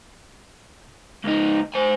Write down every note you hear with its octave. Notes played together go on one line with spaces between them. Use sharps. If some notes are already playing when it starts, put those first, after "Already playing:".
C#2 D#4
C5 G#5